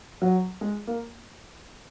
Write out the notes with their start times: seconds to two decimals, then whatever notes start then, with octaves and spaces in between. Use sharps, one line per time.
0.22 F#3
0.61 G#3
0.87 A#3